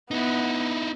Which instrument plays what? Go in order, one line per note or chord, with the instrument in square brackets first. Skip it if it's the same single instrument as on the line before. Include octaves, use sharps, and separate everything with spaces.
[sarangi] B3 [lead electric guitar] D#4 E4